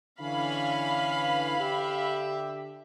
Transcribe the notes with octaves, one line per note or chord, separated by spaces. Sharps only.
D3 E3 C#4 F5 B5
D3 G4 E5